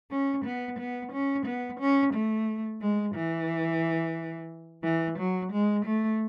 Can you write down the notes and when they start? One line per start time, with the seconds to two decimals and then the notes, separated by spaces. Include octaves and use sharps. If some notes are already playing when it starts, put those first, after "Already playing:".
0.11 C#4
0.45 B3
0.79 B3
1.12 C#4
1.46 B3
1.80 C#4
2.14 A3
2.82 G#3
3.15 E3
4.84 E3
5.19 F#3
5.52 G#3
5.85 A3